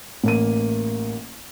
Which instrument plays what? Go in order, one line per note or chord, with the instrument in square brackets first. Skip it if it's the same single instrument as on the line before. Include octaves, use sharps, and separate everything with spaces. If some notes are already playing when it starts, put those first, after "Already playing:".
[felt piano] A1 A#3 D#7